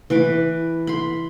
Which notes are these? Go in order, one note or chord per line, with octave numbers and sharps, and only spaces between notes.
E3 B4 D6
B5 C6